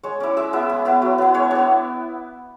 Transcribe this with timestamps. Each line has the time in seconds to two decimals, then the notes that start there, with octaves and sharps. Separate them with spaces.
0.03 G#3 C#5
0.20 C#4 E4 D5
0.37 G#3 E5
0.53 B3 E4 E5
0.69 G#3
0.85 B3 E4
1.02 F#3
1.18 B3 E4
1.34 G#3 C#5
1.51 B3 D4 C#5